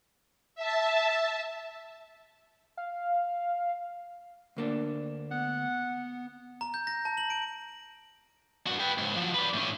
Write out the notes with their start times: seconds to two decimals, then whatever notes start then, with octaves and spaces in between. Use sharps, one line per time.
0.55 E5 A5
2.77 F5
4.56 D2 A#3 D4
5.31 B3 F#5
6.61 A#5
6.74 G6
6.87 A#6
7.05 A5
7.17 F#7
7.30 D7
8.67 G2 F#4
8.80 B4 G5
8.98 C#2 G#2
9.16 F3 F#3
9.34 B4 D5
9.54 A2 C#4